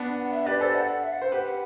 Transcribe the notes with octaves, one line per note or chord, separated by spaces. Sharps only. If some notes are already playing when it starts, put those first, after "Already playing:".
Already playing: B3 D4
F#5
F#5
E5
G4 B4 D5
A4 C5 D5
F#5
E5
F#5
C5
G4 B4 F#5
F#5